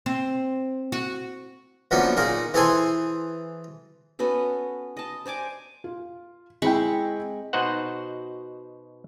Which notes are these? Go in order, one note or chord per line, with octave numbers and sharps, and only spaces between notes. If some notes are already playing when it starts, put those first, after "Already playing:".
C4
F#4
F#2 D3 F3 A#3 B3 D#4
A#2 D#4 G#4 A#4
E3 G#4 A4 C5 G#5 C6
B3 C#4 F#4 A4
D#5 A5
C5 D5 G#5 D6
F4
G#3 C4 E4 G5 B5 C#6
B2 D#4 F#4 C5 F#5